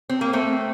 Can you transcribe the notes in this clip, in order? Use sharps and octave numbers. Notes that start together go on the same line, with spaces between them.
C4
A#3
A3 C4